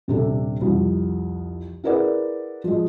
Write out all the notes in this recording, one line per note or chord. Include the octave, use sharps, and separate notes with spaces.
D#1 C3 D4 A4
C2 F2
E4 G#4 A#4 B4 D5 F#5
F3 G#3